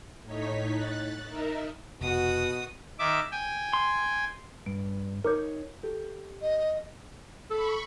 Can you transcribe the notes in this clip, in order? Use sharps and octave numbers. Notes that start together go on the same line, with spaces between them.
A2 D#4 C#5 B6
F#6 A6
D#4 A#4 E5
F1 B2 F#4 D#6
D#3 E5 D6
G5 G#5
C6
G2 D7
D#4 A#4 C#5 D6 G6
G4 A4
D#5
A4 B5 C#6